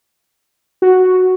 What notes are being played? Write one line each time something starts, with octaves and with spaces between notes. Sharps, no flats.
F#4